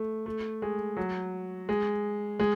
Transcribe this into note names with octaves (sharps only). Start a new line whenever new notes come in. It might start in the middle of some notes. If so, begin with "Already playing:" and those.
Already playing: A3
A3
G#3
F#3
G#3
G#3